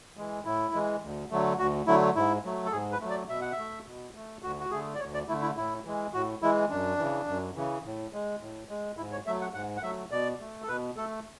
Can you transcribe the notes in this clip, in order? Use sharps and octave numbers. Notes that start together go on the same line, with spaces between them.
E3 G#3
A2 E4
E3 G#3
D2
D3 F#3 A3
D2 F#4
D3 F#3 A3 E4
G#2 E4
F#3 A3
A4
G#2 G#4
B4
F#3 A3
D5
B2 E5
F#5
E5
A3
B2
A3
D2 F#4
F#4
D3 A3 G#4
D5
D2 C#5
D5
D3 A3 E4
E4
A2 E4
E3 G#3
A2 F#4
E3 G#3 E4
F#2 D4
C#3 E3
F#2
C#3 E3
A2
G#3
A2
G#3
G#2 E4
C#5
F#3 A3 E5
F#5
G#2 F#5
F#5
F#3 A3 E5
B2 D5
A3
A4
B2 B4
A3 A4